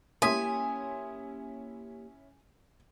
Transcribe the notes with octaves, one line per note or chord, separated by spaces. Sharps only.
A#3 C#4 E4 G4 G#5 C6 D#6 B6